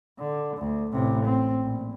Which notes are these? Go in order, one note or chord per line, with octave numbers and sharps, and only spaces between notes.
D3
D2
A1 C3
C4
A#1